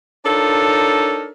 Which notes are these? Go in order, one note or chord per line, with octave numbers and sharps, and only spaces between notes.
D4 D#4 F4 A4 A#4 C#5